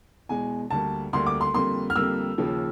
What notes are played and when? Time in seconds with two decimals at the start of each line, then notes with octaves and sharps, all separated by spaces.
0.29 E2 B2 G#3 G#5
0.71 D2 D3 G3 A#3 A5
1.13 D2 D3 G3 A#3 C6
1.26 D6
1.41 C6
1.54 F2 D3 G3 A#3 C6
1.90 F6
1.96 F2 D3 G3 A#3 E6
2.38 D#2 C#3 F3